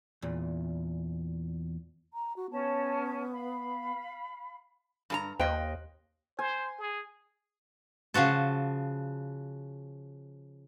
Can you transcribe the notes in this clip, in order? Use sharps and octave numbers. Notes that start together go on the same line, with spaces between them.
E2 A#2
A#5
F#4
B3 C#4 C#5 A5
F5 B5
G2 G#4 A#5
D#2 C5 D#5 F5 G5 F#6
C5 G#5
G#4
C#3 F3 F#4 A5